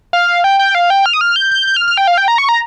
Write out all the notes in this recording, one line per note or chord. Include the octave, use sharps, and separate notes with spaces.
F5
G5
G5
F5
G5
F6
D#6
F6
G6
G6
G6
F6
F6
G5
F5
G5
A#5
C#6
A#5